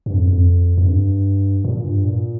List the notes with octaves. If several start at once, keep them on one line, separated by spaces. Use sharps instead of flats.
G2
F2
F2
F2
G2
A#2
G2
A#2